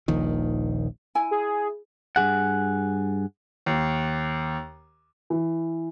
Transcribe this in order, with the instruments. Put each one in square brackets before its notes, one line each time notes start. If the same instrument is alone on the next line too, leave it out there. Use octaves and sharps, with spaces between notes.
[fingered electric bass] D#1 A#1 D#3
[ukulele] E4 G#5
[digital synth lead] G#4
[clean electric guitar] G2 D#3 G#4 F#5
[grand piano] D#2
[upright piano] E3